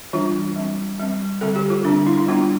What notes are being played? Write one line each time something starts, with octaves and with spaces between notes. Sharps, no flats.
E3 G3 D4 F4
G3 C4
G3 C4
D3 G3 C4 A4
G4
F4
D3 G3 C4 D4
E4
E4
G3 B3 D4 F4